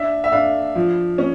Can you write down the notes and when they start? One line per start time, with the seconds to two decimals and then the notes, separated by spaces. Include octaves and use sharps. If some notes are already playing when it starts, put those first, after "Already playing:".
Already playing: D4 E5
0.24 E5
0.32 D4 F5
0.75 F3
1.18 C#4